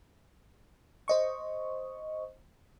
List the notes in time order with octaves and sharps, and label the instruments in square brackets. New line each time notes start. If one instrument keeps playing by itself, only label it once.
[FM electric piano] C5 D#5 C#6